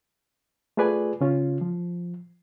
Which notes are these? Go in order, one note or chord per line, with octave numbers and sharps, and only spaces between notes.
A3 F4 G#4 B4 D5 G#5
C#3 C#4 F4
F3